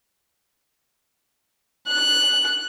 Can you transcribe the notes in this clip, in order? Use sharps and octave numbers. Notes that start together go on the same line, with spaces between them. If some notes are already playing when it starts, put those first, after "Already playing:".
F#6